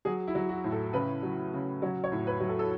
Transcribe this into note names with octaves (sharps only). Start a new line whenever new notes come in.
F#3 G#4
E4
F#3
F#4
A2
A4
C#3 B4
F#3
C#3
F#3 C#5
C#5
A2
B4
F#3
A4
A4